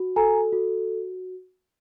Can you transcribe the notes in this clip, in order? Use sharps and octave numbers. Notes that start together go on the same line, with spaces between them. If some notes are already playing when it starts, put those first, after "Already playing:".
Already playing: F#4
A4 G#5 A#5
F#4